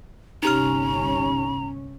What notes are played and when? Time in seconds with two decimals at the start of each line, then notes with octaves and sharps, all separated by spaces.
0.43 G1 C2 C#4 D#4 G4 A#5 F6